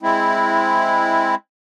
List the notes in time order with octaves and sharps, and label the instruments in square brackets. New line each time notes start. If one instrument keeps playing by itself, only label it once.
[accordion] G#3 C4 E4